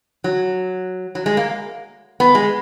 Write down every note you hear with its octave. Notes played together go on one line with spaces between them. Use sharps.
F#3
F#3
G#3
A#3
B3
G#3